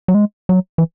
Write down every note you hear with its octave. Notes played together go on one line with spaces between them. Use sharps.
F#3
G#3
F#3
E3